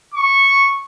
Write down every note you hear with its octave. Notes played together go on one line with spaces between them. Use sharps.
C#6